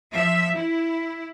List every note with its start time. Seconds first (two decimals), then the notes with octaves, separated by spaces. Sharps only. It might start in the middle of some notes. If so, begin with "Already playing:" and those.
0.12 F3 E5
0.56 E4